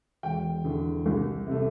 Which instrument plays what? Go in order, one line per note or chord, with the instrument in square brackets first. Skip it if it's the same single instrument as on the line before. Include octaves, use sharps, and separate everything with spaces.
[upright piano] E1 G5
E2 D3
C2
C3 A3